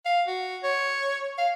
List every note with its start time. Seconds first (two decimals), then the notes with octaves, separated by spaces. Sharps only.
0.05 F5
0.27 F#4
0.63 C#5
1.38 F5